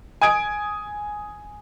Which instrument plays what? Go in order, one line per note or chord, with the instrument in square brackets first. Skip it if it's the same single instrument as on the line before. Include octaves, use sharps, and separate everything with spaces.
[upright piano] G#5 D#6 G#6 D7